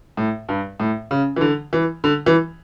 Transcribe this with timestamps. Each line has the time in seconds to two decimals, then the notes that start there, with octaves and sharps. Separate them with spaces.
0.17 A2
0.49 G2
0.80 A2
1.11 C#3
1.36 E3
1.41 D3
1.73 E3
2.04 D3
2.26 E3